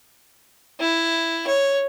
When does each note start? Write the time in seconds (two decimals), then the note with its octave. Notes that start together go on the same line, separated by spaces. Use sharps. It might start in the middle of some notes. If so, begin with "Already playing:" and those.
0.80 E4
1.48 C#5